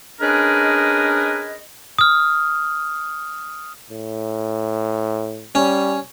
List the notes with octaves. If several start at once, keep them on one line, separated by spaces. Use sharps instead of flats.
C#4 D4 G#4 A#4 B4 D#5
D#6 F6
A2
G3 C#4